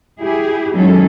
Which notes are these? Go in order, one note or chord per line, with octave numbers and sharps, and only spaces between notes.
E4 G4 G#4
D#3 F#3 G#3 C#4 A4